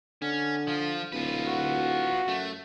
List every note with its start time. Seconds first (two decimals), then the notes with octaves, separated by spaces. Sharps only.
0.22 D3 C#4
0.67 F3 F4
1.12 D1 F4 B4
1.48 F#4
2.28 F#2 A3